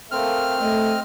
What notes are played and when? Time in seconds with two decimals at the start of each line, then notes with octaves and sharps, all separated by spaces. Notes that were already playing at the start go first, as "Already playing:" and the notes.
0.11 A3 A#3 C4 F6
0.61 A3 D#5